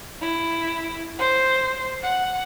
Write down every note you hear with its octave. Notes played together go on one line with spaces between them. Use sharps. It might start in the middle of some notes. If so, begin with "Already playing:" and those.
E4
C5
F#5